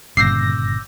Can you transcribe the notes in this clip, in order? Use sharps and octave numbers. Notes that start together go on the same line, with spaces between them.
G1 A#2 C#3 D6 E6 G6 A#6 C7